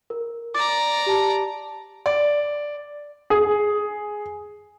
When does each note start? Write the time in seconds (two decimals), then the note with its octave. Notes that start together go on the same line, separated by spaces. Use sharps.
0.10 A#4
0.54 D5 A#5 D6 A6
1.06 G4 A5
2.06 D5
3.30 G#4